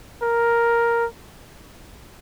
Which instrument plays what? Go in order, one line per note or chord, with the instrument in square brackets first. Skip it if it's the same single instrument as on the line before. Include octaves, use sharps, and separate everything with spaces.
[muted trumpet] A#4